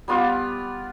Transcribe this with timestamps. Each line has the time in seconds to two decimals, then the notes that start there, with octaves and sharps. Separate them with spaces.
0.08 G3 B3 F4 D6